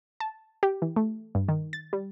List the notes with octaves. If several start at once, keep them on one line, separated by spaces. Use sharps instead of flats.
A5
G4
E3
A3
G2
D#3
A6
G3